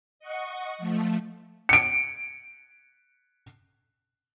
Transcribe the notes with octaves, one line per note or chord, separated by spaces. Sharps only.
D#5 F#5 C#6 C#7
F3 A3
C#7 D7